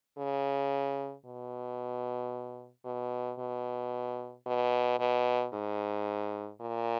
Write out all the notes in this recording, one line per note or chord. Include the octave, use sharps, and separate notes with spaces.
C#3
B2
B2
B2
B2
B2
G#2
A#2